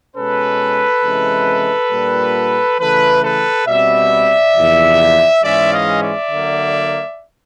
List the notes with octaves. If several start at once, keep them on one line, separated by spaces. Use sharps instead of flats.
B2 G#3 C#4 A4 B4
C3 E3 G#3 C#4 E4
A#2 G3 A#3 D4 F4
C#3 E3 A3 A4 B4
A4 B4
B2 G3 C4 D5 E5
E2 C3 F3
G#2 E3 G#3 C#4 D5 E5
D#5 F5
D5 E5
D3 F#3 A#3